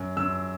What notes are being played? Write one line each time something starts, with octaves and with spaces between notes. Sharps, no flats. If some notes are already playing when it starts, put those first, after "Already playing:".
Already playing: F#2
F#2 E6